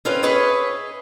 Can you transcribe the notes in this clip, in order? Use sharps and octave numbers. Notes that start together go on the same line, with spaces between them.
C4 C#4 F4 G#4 B4
G#4 B4 C#5 D#5 E5